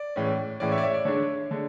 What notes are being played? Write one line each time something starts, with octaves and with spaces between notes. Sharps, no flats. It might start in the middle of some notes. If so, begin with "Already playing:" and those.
Already playing: D5
A2 E3 G#3 C#4
A2 E3 G#3 C#4 D5
C#5 E5
D5
C#5 E5
D5
D3 G#3 D4 C#5
D3 G#3